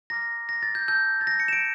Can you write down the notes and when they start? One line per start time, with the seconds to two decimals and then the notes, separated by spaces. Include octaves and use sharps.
0.10 A#5 D6 F6 A#6
0.49 A#6
0.63 A6
0.75 G6
0.88 A5 E6 G6
1.21 A6
1.27 A#6
1.40 C#7
1.48 E7
1.53 D7